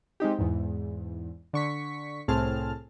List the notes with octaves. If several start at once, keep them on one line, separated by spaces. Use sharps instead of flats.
G#3 C4 D#4 G4
E2 G#2
D3 C#6 B6
C2 A2 C4 G#4 A5 F6